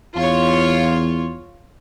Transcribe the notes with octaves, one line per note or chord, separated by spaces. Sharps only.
E2 F4 C#5